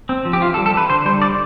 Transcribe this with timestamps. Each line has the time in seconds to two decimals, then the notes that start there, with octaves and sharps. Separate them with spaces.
0.09 C4
0.25 F3
0.33 G4
0.41 E3 F4
0.54 A4
0.57 G3
0.66 A4
0.74 E3 B4
0.90 D3 C5
1.06 G3 C5
1.22 D3 D5